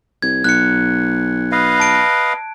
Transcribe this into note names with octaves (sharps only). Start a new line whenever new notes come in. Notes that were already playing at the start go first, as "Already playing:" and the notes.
C2 G#6
B1 F#6 C#7
B4 D#5 F5
A5 D7